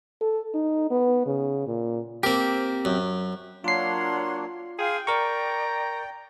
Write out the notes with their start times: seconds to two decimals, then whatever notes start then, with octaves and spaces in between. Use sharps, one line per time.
0.21 A4
0.54 D#4
0.90 B3
1.26 C#3
1.67 A#2
2.23 A#3 C4 G4 A#4
2.85 F#2
3.64 F#3 A#3 D4 F4 C#5 F#5 C6 C7
4.79 G#4 F5 G5 C6 F6
5.07 A#4 D5 A#5 C#6